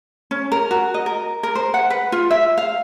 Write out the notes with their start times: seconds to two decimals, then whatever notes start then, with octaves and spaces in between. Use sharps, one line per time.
0.31 C#4
0.52 A#4
0.71 F#4
0.94 D#5
1.06 A#4
1.43 A#4
1.55 C5
1.74 F#5
1.90 B4
2.12 F4
2.31 E5
2.58 F5